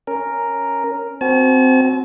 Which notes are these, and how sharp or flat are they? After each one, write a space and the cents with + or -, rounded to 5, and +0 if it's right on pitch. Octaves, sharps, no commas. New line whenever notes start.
C#4 +0 A#4 +0
C4 -10 F#4 +0 A5 -45